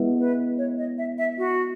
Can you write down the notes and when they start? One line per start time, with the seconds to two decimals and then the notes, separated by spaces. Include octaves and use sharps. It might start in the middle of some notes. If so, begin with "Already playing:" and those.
Already playing: G#3 B3 E4
0.20 B4
0.58 C#5
0.78 D#5
0.98 E5
1.18 E5
1.38 F#4